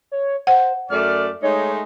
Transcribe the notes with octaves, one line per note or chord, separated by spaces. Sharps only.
C#5
C5 F#5
F#2 A3 D5 F6
G#3 A3 D#4 C#5